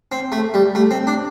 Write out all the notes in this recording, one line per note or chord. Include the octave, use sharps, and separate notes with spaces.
C4
A3
G3
A3
C4
D4